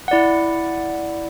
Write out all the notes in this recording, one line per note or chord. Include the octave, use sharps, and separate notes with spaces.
E4 D5 F#5